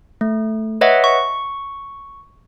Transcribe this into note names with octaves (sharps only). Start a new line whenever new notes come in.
A3
B4 C#5 D#5 E5 F#5
C#6